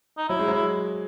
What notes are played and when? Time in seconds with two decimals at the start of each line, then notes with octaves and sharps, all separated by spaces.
0.18 D#4
0.29 F#3 E4
0.39 G#3
0.48 F#3
0.53 E4